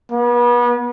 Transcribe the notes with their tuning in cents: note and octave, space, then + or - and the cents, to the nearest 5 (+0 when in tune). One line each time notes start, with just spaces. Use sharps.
B3 -35